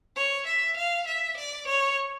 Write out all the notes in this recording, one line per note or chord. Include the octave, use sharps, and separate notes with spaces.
C#5
E5
F5
E5
D5
C#5